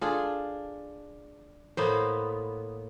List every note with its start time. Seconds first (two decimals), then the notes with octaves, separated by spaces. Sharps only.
0.01 D4 F4 G#4 A4
1.77 A2 A#3 B3 C5